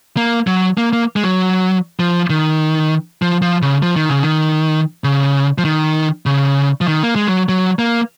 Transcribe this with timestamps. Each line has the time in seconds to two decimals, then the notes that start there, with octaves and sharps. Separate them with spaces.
0.17 A#3
0.47 F#3
0.78 A#3
0.93 A#3
1.16 G#3
1.23 F#3
2.00 F3
2.30 D#3
3.22 F3
3.42 F3
3.62 C#3
3.82 F3
3.96 D#3
4.10 C#3
4.23 D#3
5.04 C#3
5.58 F3
5.65 D#3
6.26 C#3
6.81 F3
6.88 D#3
7.03 A#3
7.16 G#3
7.27 F#3
7.49 F#3
7.79 A#3